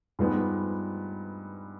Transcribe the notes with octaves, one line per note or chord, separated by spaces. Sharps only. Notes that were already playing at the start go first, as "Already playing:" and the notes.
G2 F3 G#3 B3 D#4